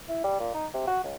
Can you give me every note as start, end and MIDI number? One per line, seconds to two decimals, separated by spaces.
0.09 0.24 64
0.24 0.39 55
0.39 0.52 46
0.54 0.66 63
0.74 0.86 48
0.87 1.01 66
1.04 1.15 37